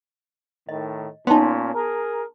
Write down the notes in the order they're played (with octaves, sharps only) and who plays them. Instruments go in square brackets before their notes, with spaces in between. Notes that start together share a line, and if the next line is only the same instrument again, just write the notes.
[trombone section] A2 D#3 [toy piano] D#5
[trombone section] A#2 C#4 [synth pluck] B3 D#4 [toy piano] A5 C6
[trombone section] G#4 A#4